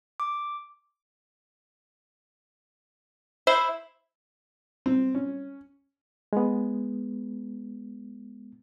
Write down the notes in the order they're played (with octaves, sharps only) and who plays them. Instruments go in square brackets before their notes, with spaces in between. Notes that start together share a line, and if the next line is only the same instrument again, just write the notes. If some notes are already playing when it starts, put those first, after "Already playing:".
[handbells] D6
[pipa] E4 [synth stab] C5
[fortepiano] C4
C#4
[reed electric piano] G#3 B3